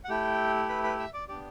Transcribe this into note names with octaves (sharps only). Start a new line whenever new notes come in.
F#5
A3 E4 G4 G5
B4 B5
B4 B5
E5 E6
D5 D6
B3 D4 G4 D5 D6